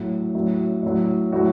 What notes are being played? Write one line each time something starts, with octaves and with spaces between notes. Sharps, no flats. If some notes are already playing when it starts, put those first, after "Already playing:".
Already playing: A2 F#3
A2 F#3
A2 F#3
A2 F#3 F#4